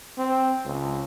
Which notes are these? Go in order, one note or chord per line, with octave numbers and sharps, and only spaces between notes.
C4
C#2